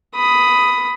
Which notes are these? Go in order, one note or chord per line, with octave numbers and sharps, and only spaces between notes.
B5 D#6